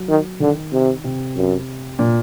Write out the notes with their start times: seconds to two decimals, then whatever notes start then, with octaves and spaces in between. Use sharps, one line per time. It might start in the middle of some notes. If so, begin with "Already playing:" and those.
Already playing: F#3
0.09 D#3
0.40 D3 D#3
0.72 C3
1.04 C3
1.36 F#2
1.99 A#2